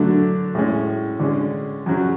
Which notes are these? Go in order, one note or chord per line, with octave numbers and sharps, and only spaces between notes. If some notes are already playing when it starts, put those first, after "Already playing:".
Already playing: D3 F#3 A3 D4
A2 G#3 C#4
D3 G#3 C#4
F#2 C#3 F#3 C#4